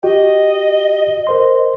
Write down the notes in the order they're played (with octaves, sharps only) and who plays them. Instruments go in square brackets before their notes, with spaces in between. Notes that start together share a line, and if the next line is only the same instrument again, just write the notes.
[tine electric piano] F#4 G4 G5 [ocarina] D#5
[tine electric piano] A#4 C5 C6